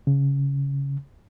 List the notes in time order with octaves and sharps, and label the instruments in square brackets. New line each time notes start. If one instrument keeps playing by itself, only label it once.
[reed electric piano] C#3